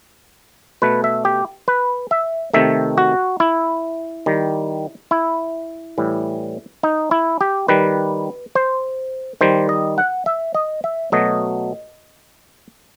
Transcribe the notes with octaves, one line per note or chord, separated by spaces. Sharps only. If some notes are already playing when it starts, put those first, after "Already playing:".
B2 A3 B4
E5
G4
B4
E5
C3 D#3 A3 E5
F#4
E4
D#3 G3
E4
A2 E3 G3
D#4
E4
G4
D#3 G3 B4
C5
D#3 G3 C5
D#5
F#5
E5
D#5
E5
B2 F#3 A3 D#5